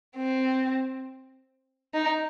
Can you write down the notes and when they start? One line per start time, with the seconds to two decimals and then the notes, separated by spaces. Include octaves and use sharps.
0.17 C4
1.94 D#4